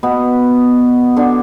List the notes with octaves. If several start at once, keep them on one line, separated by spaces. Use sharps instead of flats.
B2 B3
D3 D4